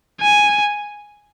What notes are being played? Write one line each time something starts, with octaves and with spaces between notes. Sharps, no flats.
G#5